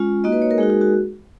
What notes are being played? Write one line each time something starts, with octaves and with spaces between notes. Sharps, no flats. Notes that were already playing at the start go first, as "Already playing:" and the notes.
Already playing: G#3 C#4 F4
A#3 D#4 F#4 D#5
B4
C#5
A#4
G#3 D#4 F#4 G#4
F#4
F#4